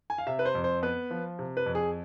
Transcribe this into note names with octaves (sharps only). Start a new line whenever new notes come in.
G#5
F5
C3 E5
B4
C5
F2
C5
B3 B4
F3
C3
B4
F2
G#4